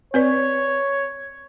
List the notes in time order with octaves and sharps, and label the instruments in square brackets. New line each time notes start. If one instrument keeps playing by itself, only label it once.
[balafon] C4 B4 D5 [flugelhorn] C#5